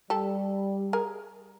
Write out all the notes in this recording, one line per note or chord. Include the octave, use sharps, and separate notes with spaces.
G3 G4 A4
G#4 A#4